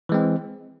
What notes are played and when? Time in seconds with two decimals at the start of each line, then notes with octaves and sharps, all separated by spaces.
0.09 E3
0.12 G#3
0.14 C4